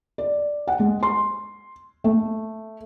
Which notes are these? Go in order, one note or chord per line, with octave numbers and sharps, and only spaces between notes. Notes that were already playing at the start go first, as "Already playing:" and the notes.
D5
F#5
G#3
C6
A3